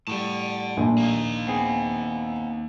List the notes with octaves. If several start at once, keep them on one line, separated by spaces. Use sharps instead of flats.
A2 G3 F#5 A5
A#1
A#3 D#4
B3 C4 G#4